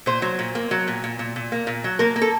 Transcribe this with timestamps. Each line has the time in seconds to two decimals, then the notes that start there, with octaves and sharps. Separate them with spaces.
0.06 A#2 C5
0.22 F#3
0.39 A#2
0.55 A#3
0.71 F#3
0.88 A#2
1.04 A#2
1.19 A#2
1.36 A#2
1.52 A#3
1.67 A#2
1.84 F#3
1.99 A#3 A#4
2.16 A#3
2.21 A4